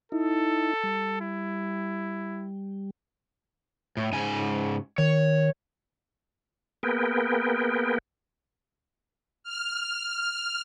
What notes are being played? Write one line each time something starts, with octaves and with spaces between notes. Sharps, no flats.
D#4 E4 A4
G3
E4
A2
G#2 C#3 G#5
D#3 C#5
A#3 B3 G#4 A#4 B4 G5
F6